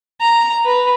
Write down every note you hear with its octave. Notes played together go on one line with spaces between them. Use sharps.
A#5
B4